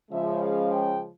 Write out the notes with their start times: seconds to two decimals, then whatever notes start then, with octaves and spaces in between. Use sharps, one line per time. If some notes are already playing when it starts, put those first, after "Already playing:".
0.11 C#3 F3 G#3 E5
0.41 F5
0.72 G5